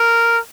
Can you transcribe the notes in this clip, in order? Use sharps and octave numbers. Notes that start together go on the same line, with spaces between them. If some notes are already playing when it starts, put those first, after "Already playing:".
Already playing: A#4